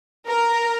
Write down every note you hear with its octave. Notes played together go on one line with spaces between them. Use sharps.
A#4